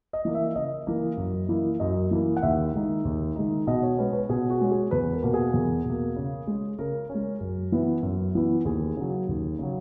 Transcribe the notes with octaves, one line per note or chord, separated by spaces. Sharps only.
D#5
E3 A#3
E5
C#3 D#5
E3 A#3
F#2
E3 A#3 E4
F#2 D#5
E3 A#3 E4
F#5
D#2 E5
D#3 G#3 D#4
D#2
D#3 G#3 D#4
B2 D#5
C#5
G#3 C#4 B4
B4
B2 G#4
F#4
G#3 C#4
G#4
E2 B4
A#4
B2 A#3
G#4
E2
B2 A#3
C#3
G#3 C#4
C#3 A#4
C#4
G#3
F#2
E3 B3 E4
F#2
E3 B3 E4
D#2 G#4
C#3 F#3
D#2
C#3 F#3